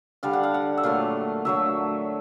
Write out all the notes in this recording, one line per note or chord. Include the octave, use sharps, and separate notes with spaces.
D3 G3 F5
F#5
F5
F#5
E5
A#2 F#3 A3 F5
D3 F#3 A3 E5